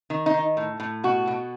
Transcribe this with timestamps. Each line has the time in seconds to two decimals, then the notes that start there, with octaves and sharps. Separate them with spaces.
0.10 D#3
0.26 D#4
0.34 D#3
0.57 A2
0.80 A2
1.04 B2 F#4
1.27 B2